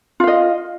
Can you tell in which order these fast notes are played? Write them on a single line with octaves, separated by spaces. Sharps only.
F4 F5 D#5